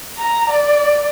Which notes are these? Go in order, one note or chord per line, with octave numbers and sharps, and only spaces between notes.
A#5
D5